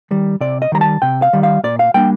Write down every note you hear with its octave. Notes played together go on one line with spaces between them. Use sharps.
D#3 G3
C3 D5
D#5
D#3 G3 A#5
A5
C3 G5
F5
D#3 G3
F5
A#2 D5
F5
G3 A#3 D4 G5